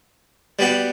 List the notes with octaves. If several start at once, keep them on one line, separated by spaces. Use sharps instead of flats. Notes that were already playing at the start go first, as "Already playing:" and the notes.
G3 B3 F#4